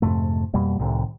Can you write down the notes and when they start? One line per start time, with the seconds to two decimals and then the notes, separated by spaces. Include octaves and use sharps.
0.02 F2 G#2 C3 A3
0.54 F2 B2 G3 A#3
0.79 C2 A2 C3 D#3